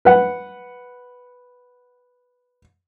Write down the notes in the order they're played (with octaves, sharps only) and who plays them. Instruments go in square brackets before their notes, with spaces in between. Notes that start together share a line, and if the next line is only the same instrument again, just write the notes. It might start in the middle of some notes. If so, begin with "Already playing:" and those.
[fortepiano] B4 F#5